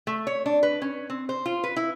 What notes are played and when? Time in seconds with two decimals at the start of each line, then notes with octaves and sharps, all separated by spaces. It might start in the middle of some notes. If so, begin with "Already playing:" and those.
0.07 A3
0.27 C#5
0.46 D4
0.63 B4
0.82 C#4
1.10 C4
1.29 C5
1.46 F4
1.64 B4
1.76 E4